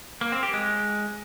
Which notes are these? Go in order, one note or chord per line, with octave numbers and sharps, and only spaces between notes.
A#3
C4
G4
G#3